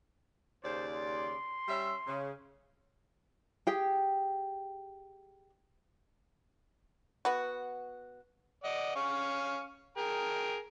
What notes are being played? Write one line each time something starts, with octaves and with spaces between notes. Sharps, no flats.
D#2 C#3 C5 D5
C6
G3 C#4 E5
C#3
G4 G#4 G5
B3 F#4
D5 D#5 F#5
C#4 F5 C#6
G#4 A#4 G5